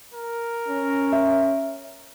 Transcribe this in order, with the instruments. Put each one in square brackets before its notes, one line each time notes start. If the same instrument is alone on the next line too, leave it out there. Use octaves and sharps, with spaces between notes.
[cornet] A#4
[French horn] C#4
[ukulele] E5